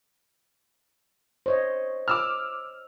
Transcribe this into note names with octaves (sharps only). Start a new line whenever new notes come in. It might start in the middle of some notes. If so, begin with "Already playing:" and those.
C5 C#5 D#5
D6 E6 F6